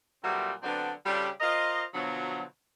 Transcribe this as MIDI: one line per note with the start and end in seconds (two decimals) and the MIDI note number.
0.24 0.52 46
0.24 0.52 54
0.24 0.52 55
0.24 0.52 57
0.24 0.52 59
0.24 0.52 60
0.63 0.92 50
0.63 0.92 54
0.63 0.92 59
0.63 0.92 60
0.63 0.92 62
1.06 1.29 49
1.06 1.29 55
1.06 1.29 62
1.06 1.29 65
1.06 1.29 67
1.06 1.29 69
1.40 1.83 65
1.40 1.83 70
1.40 1.83 72
1.40 1.83 75
1.94 2.43 47
1.94 2.43 50
1.94 2.43 53
1.94 2.43 54